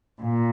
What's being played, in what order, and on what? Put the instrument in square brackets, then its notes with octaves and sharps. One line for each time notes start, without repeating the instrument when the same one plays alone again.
[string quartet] A#2